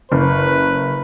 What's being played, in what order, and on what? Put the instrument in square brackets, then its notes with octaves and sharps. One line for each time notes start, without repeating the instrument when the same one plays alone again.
[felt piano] F#1 [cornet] B4